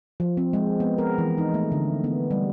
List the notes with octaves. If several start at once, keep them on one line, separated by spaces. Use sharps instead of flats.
F3
C4
G#3
B3
A#4
E3
D#4
A3
D3
B3
G3